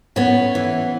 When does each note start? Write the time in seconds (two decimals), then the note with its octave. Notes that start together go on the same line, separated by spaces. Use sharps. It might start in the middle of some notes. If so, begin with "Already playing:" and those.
0.16 A2 B3 C#4
0.55 E3